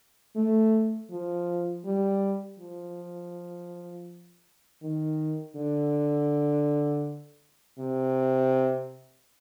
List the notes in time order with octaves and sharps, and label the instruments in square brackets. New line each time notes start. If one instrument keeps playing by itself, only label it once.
[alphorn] A3
F3
G3
F3
D#3
D3
C3